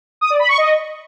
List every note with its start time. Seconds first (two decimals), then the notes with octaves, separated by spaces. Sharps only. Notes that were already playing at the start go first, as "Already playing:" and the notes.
0.21 D#6
0.30 D5
0.39 B5
0.49 C#6
0.58 D#5